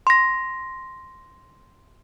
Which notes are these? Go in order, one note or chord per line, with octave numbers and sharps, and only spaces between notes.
C6 A#6